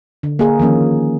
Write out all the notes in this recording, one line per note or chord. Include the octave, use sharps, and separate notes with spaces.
D3
A#3 G#4 A#4
D#3 F3 A#3 C#4